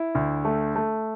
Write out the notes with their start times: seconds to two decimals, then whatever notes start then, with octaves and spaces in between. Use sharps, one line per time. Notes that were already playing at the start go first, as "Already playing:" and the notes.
Already playing: E4
0.15 D2
0.45 A3
0.76 A3